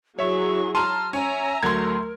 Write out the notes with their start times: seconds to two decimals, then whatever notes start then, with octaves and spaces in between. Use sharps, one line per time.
0.19 F#3 E4 G#4 C#5 E5 C#6
0.75 A5 A#5 C6 F6 D#7
1.13 C#4 C#5 E5 G#5 A#5
1.63 D2 F#3 A3 A#4 C6 G#6